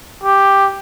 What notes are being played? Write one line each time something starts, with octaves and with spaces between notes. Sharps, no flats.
G4